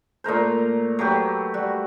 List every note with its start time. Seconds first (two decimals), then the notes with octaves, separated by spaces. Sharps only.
0.24 A#2 A3 A#4 C5
0.99 F#3 A3 G4 B4
1.54 G3 F#4